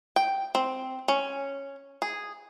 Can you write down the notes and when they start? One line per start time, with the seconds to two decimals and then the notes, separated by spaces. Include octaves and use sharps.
0.16 G5
0.55 C4
1.08 C#4
2.02 G#4